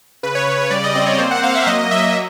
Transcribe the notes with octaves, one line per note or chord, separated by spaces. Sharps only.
C#3 B4
C#5
C#3 C#5
C#5
G3 D5
D#5
C4 D#5
C#5
A#3 C5
F#5
A#3 F5
E5
F#3 D#5
F#3 E5
E5